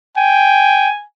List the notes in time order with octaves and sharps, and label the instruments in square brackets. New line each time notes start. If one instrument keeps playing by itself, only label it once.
[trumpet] G5 [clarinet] G#5